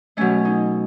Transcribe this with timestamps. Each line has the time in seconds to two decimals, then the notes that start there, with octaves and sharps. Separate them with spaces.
0.17 B2 F#3 A3 C#4
0.45 D#4